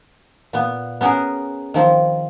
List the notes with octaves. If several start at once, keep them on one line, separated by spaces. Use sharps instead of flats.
A#2 B3
B3 C#4 F#4 G#4 A#4
D#3 F3 C4